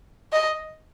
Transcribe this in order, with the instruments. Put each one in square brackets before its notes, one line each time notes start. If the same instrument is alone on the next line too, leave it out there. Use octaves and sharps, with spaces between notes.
[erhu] D#5